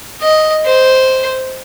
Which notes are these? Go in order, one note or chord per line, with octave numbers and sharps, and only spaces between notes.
D#5
C5